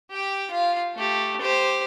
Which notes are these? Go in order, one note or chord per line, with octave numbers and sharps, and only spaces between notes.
G4 G5
F4 F5
A3 G4
G4 C5